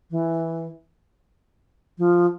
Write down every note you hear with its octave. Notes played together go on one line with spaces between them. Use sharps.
E3
F3